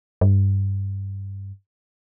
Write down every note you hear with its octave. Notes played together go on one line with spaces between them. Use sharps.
G2